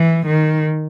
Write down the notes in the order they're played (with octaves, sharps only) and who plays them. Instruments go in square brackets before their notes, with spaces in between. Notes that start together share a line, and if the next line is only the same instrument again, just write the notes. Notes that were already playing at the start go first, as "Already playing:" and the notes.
Already playing: [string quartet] E3
D#3